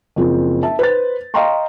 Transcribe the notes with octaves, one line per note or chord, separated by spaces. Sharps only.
F#1 F3 C4
E5 A5
B4 C5 A6
D#5 F5 G5 A#5 C6 C#6